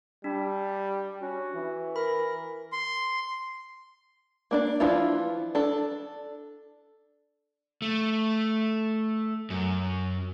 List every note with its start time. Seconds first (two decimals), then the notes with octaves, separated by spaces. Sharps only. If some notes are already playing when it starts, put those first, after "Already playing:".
0.24 G3 D4
1.22 C#4 F#4
1.55 E3
1.96 A#4 B5
2.72 C6
4.51 A#3 D4 D5
4.80 E3 F3 D4 E4 F4
5.55 D4 A4
7.82 A3
9.50 F#2